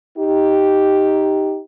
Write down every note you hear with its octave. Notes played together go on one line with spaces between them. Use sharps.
D#4 G4